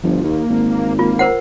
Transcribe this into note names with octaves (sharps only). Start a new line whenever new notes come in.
G1 F3
D#2 A#3
G#1
A#3 F4
A#4 C5 F#5